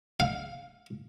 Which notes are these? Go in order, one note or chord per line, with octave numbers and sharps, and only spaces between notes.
F5